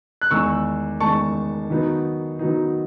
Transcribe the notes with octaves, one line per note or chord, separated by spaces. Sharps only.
F#6
E2 D#3 G#3 C#6 E6
E2 D#3 G#3 A5 C#6
D#3 F#3 B3 D#4
D#3 F#3 B3 D#4